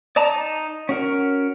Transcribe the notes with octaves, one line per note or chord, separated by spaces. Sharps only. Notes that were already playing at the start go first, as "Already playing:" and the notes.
D5 D#5 A5 A#5
D#4
C#4 F#4 A#4